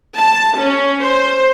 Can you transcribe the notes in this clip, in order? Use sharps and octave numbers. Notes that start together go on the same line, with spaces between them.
A5
C#4
C5